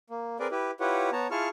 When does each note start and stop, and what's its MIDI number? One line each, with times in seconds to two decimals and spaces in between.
0.10 0.37 58
0.40 0.47 60
0.40 0.47 68
0.40 0.47 70
0.40 0.47 71
0.40 0.47 74
0.51 0.71 64
0.51 0.71 67
0.51 0.71 71
0.80 1.10 64
0.80 1.10 65
0.80 1.10 67
0.80 1.10 71
0.80 1.10 73
0.80 1.10 78
1.12 1.27 59
1.12 1.27 73
1.12 1.27 81
1.12 1.27 82
1.31 1.48 64
1.31 1.48 65
1.31 1.48 68
1.31 1.48 81
1.31 1.48 85
1.31 1.48 89